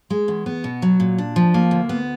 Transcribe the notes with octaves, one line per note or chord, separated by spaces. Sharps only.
G#3
E2
B3
B2
F#3
A#2
D4
F3
A#3
D2
B3